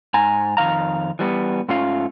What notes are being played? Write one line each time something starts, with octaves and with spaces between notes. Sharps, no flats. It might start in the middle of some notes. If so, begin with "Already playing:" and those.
G#2 G#5 A#5
F2 D#3 F5 A#5
E3 G3 A#3 B3
G#2 A3 C#4 F4 F5